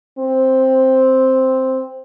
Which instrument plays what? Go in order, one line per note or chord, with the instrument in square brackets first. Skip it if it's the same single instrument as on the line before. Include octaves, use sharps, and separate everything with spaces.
[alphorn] C4